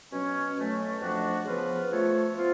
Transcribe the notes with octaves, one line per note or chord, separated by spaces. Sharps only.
B2 F#3 C#4
B2 F#3 A3 C#4
F2 F3 A3 D4 F#4
C#3 F3 B3 F4 B4
F3 A3 F4 A4 C#5
F3 B3 F4